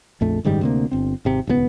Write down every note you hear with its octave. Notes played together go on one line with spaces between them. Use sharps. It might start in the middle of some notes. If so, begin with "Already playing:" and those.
A#1 F2 A3
F#1 G#2 D#3 G3
D2 C3 A#3
G1 C4
G#1 C3
D#1 C#2 F3 B3